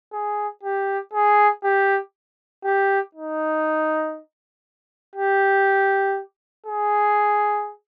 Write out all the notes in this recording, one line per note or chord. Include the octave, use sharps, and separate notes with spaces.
G#4
G4
G#4
G4
G4
D#4
G4
G#4